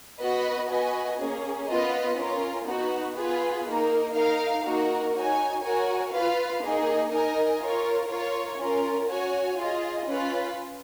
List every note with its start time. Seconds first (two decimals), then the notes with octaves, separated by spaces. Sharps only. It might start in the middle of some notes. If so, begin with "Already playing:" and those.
0.19 B3 F#4 B4 D#5
0.68 B3 F#4 B4 D#5 G#5
1.18 A#3 C#4 G#4
1.68 B3 F4 B4 D#5
2.17 C#4 F4 A#4
2.66 B3 D#4 F#4
3.16 B3 F4 G#4 B4
3.65 A#3 D#4 A#4
4.14 D#4 A#4 F5
4.64 A#3 D#4 F#4 A#4
5.13 D#4 F#4 C#5 G#5
5.62 F#4 A#4 C#5 G#5
6.12 F4 B4 F5
6.61 A#3 D#4 G#4 D#5
7.11 D#4 A#4 D#5 G#5
7.60 F4 A#4 C#5
8.09 F4 A#4 C#5
8.58 C#4 F4 A#4
9.08 F#4 C#5 G#5
9.57 F4 G#4 D#5
10.06 C#4 F4 B4